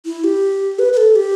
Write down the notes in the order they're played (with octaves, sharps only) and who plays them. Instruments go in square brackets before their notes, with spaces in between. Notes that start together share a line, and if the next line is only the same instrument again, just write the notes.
[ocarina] E4
G4
B4
B4
A4
G4